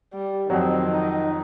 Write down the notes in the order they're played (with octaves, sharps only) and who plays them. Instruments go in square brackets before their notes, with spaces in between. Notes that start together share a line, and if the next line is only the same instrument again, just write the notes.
[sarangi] G3
[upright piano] F2 F#3 [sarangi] D#3 [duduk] C4
[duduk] D#4